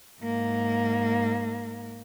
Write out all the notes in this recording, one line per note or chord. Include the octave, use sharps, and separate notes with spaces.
G#2 A#3